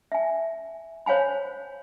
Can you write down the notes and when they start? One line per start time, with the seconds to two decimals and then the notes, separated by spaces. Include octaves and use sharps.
0.12 E5 G#5
1.06 C5 C#5 F5 G#5 B5